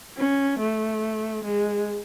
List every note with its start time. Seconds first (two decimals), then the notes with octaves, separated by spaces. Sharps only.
0.17 C#4
0.60 A3
1.44 G#3